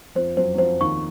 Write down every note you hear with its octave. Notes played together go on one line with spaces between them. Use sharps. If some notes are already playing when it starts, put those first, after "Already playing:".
F2 F3 C5
F#2 F#3 C5
F#3
F2 F3 C5
D#2 D#3 C#6